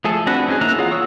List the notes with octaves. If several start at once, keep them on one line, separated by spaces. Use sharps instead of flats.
F3 A3 G#4 A4
C4 D4 F#4 B4 F#5
C4 C#4 D#4 G4 G#4
E3 A#3 E5 A#5 F#6
F4 G#4 C#5 F5 F#5
F#5 C#6 D#6 E6